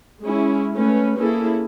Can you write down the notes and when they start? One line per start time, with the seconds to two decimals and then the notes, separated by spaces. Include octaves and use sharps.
0.21 G#3 C#4 E4
0.75 A3 C#4 B4
1.19 A#3 C#4 E4 G#4 A4